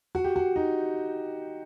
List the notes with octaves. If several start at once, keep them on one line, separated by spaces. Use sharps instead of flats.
F#4
G4
F#4
D#4